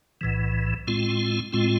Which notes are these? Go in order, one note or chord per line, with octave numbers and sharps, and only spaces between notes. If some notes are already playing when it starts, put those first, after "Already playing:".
B1 A2 E3
A2 G#3 C4 F4
A2 G#3 C4 F4